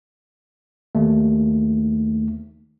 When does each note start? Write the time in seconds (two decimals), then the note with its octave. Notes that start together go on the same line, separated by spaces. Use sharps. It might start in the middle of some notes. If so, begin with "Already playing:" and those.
0.95 D#2 A3